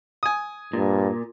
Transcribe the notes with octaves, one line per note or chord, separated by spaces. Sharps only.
G#5 D#6
G2 A#2